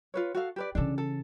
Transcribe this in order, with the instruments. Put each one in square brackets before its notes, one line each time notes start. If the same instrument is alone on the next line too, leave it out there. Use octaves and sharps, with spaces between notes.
[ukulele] F4 B4 C#5
F#4 A4 F5
G4 B4 D5
[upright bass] C#3 E3 [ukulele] D4 A4
[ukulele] A4